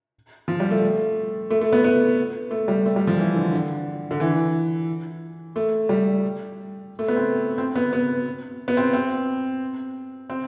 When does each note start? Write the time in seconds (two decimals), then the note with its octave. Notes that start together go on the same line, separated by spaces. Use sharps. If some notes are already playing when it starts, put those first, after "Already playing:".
0.48 F3
0.60 G3
0.71 A3
1.50 A3
1.61 A3
1.72 B3
1.84 B3
2.51 A3
2.68 G3
2.86 A3
2.96 G3
3.07 F3
3.18 E3
3.36 D3
3.52 D3
4.11 D3
4.20 E3
5.56 A3
5.89 G3
6.99 A3
7.08 B3
7.16 C4
7.58 C4
7.75 B3
7.93 B3
8.68 B3
8.77 C4
8.93 C4
10.30 C4